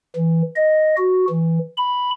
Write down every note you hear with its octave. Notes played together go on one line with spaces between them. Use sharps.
E3
D#5
F#4
E3
B5